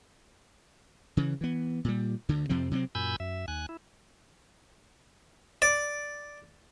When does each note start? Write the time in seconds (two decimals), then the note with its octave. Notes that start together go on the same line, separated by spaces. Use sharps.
1.17 C#3 E3
1.41 E3 B3
1.85 A#2 G3
2.29 D2 D3
2.49 F2 C3 F3 C4
2.71 C3 F#3 A3 C4
2.95 F#2 A#2 G#5 B5 E6 G6
3.20 F#2 E5
3.48 D#2 G#5 F#6
3.69 E4
5.62 D5